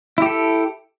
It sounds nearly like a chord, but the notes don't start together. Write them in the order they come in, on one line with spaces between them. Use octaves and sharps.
E4 G4 A4